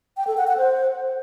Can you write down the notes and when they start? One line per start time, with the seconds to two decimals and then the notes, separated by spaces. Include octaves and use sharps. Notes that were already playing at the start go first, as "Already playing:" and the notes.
0.17 G5
0.27 A4
0.37 F#5
0.47 F#5
0.57 C5